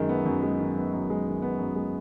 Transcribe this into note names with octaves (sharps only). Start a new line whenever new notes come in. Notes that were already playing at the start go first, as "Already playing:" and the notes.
Already playing: F#2 D#3 G#3
B3
F#2
G#3
D#3
B3
F#2
G#3
D#3
B3
F#2
G#3